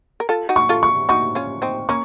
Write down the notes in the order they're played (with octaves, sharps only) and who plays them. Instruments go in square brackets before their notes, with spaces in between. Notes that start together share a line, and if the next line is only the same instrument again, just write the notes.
[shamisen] A#4
F4 A4
D#4 F#4
[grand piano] C#6
[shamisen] F4 A4
[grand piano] C#6
[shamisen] D#4 F#4 [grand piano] C#6
[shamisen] C#4 F4
C4 D#4
[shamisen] A#3 C#4 [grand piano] C#6